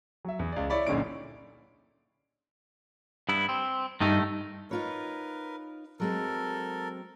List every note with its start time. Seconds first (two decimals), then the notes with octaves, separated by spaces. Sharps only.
0.25 F#3 E5
0.39 E2
0.52 C#2 D5
0.70 E4 C#5 D5 B5
0.87 F#1 A#2 D3 C#4 D#4 D7
3.29 G2 B3 E4
3.49 C4
4.00 G2 D#3 A3 D#4
4.71 D#4 F4 A#4 B4 C#5
6.00 F#3 G#3 C4 A4 A#4